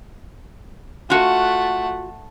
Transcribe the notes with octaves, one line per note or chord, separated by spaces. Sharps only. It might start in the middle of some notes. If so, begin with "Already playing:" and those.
A3 F4 F#4 F#5